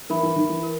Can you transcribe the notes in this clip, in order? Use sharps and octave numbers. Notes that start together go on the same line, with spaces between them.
E3 A#4 E5 B5
E3
D#3
E3
E4 A#4